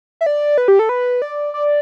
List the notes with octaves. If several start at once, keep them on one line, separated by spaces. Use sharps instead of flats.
E5
D5
B4
G4
A4
B4
D5
D5